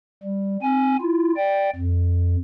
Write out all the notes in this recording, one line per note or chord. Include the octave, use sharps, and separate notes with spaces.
G3
C4 G#5
E4 F4
D5 G5
F2